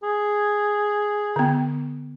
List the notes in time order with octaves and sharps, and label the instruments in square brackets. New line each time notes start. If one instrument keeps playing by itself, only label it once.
[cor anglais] G#4
[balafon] D3 B3